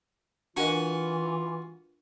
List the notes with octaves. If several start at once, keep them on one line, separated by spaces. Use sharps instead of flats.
E3 D4 F4 F#4 A#4 D#5 G#5 C#6